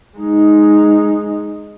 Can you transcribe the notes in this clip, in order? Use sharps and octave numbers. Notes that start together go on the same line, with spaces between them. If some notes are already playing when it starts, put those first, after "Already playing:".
G#3 D#4